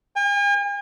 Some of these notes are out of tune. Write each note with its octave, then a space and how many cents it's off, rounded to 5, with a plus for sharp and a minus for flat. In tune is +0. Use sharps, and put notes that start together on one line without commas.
G#5 -45